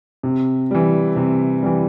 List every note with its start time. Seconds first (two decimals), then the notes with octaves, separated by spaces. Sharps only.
0.23 C3
0.71 E3 G3
1.16 C3
1.63 E3 G3